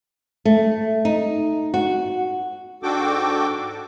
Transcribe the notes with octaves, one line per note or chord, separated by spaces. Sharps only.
A3
D#4
F#4
G#2 D4 F#4 A4 G5 D6